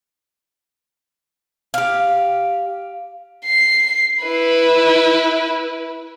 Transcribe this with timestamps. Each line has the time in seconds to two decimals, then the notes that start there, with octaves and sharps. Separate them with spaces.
1.74 G4 F5
3.45 C7
4.23 E4 B4